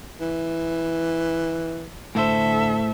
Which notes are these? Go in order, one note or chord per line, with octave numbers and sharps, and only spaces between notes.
E3
A2 D3 A4 C5 E5